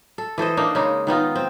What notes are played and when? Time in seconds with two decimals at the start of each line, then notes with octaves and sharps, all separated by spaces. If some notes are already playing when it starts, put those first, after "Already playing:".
0.18 A4
0.38 E3 A4 C5 D#5
0.57 A#3 D4 D#4
0.75 C#3 G#3 D#4
1.07 D#3 B3 D#4 F4
1.35 C4